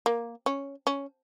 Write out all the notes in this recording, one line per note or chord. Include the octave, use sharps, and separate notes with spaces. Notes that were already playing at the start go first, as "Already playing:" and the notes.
A#3
C#4
C#4